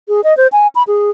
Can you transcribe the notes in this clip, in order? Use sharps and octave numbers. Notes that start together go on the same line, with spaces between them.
G#4
D#5
C5
G#5
B5
G#4